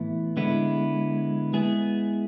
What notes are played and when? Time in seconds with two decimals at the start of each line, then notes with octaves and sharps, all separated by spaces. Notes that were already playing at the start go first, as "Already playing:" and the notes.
Already playing: A2 E3 B3 E4
0.37 D3 G#3 B3 E4
1.53 G#3 B3 E4 G#4